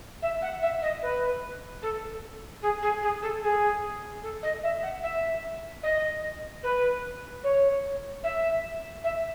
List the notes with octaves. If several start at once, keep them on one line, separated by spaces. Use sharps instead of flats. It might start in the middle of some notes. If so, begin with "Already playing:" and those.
E5
F#5
E5
D#5
B4
A4
G#4
G#4
G#4
A4
G#4
A4
D#5
E5
F#5
E5
D#5
B4
C#5
E5
E5